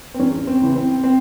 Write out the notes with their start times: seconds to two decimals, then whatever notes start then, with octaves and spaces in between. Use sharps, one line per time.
0.14 C4
0.19 E2 C#4
0.47 C4
0.61 C#3 E3
0.76 C4
1.04 C4